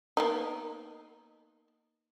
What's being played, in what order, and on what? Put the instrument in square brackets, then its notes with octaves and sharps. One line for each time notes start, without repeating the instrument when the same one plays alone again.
[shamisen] A#3 B3 D#4